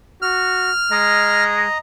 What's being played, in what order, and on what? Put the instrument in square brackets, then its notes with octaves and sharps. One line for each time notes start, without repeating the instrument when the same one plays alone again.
[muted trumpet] F#4 [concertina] F6
[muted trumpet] G#3 [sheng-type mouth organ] D#5 A#5